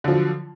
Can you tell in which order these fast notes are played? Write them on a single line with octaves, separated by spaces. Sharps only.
D3 F3 F#3